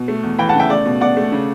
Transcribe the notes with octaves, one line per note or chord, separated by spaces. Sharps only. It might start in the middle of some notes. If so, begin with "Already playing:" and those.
Already playing: B2
A3
E2
E3 G5 B5
F#5 A5
C#3 E5 G5
A3 D5
B2
B2 D5 F#5
A3
C#3